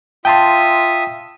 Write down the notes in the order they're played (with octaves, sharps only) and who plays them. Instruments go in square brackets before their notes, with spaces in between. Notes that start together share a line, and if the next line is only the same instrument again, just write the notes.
[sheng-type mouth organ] F4 E5 D#6 [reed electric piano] G5 A5 C6